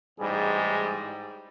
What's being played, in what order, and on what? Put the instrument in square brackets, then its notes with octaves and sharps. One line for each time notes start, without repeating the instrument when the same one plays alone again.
[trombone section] A1 G#2 G3 G#4